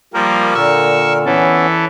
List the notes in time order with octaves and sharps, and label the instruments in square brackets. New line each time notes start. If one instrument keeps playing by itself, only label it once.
[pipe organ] F3 G3 A#3 [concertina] A#4
[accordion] A#2 D3 [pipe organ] C#6 E6
[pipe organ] E3 A4 [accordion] B3 C#4